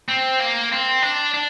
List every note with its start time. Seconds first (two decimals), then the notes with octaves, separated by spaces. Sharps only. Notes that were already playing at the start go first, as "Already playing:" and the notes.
0.09 C4
0.40 A#3
0.72 C4
1.02 D4
1.34 D4